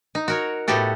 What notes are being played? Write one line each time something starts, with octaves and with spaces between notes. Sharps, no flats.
D#4
F#4 A#4 C#5
A2 B3 F#4 G4 A4